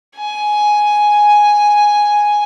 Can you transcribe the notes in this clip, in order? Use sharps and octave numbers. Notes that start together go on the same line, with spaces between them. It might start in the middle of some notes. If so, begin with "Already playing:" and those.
G#5